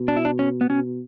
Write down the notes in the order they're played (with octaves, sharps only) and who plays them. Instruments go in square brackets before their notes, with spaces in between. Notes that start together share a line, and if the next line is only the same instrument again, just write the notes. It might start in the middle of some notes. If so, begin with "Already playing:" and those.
Already playing: [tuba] B2
[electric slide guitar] D4
E4
D4
C#4
B3
[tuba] B2 [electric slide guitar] C#4